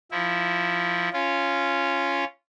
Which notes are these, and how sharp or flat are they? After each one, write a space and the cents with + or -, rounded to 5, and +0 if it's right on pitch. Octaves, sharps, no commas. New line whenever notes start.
F3 +0 E4 -10
C#4 +0 F4 -15